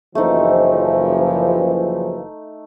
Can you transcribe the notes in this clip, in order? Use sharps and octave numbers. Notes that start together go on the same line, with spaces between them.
F#1 E3 F3 A3 D#4